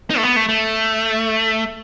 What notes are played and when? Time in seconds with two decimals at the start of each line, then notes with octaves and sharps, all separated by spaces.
0.10 D#4
0.17 A3
0.23 B3
0.36 A3
0.49 A3